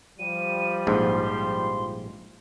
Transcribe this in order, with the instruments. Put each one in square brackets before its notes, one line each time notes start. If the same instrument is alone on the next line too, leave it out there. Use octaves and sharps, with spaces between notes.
[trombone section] F3 G3 [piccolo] D#7
[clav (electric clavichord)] A#1 G#2 [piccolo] C6